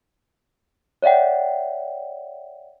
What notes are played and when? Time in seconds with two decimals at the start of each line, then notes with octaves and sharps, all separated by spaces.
1.02 C#5 D5 E5 F#5 G5